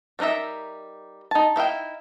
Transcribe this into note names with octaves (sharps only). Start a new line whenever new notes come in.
G3 D4 D#4 A#4 E5
D#4 A5
D#4 E4 F5 G5